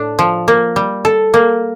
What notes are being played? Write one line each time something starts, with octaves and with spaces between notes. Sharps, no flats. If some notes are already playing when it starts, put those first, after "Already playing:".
Already playing: A2 D4
F3
A#3
G3
A4
A#3